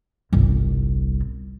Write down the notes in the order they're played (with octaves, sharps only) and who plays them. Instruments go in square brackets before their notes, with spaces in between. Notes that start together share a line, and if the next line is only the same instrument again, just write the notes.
[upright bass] G1 C2